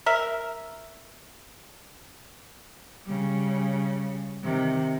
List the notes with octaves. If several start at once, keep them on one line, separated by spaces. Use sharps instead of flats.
A#4 E5
C#3 G3
C3 D#3